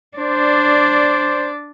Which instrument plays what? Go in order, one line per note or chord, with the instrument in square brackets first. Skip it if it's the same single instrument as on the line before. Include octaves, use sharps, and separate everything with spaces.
[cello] D4 D5 [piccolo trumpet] C5